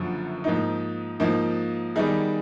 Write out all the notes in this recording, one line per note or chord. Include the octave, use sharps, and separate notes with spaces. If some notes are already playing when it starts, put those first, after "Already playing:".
Already playing: F#1 F#2 D3 F3
G#2 F3 A#3 D#4
G#2 F3 A#3 D#4
D#3 G3 B3 D#4 G#4